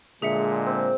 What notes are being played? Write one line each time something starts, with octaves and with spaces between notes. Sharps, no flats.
A#2 D3 G#3 G#4 E5 C#7
C4